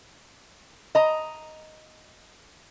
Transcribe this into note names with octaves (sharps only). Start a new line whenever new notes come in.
D#5 A#5